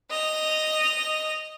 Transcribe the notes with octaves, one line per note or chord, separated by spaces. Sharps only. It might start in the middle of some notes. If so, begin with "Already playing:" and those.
D#5 F7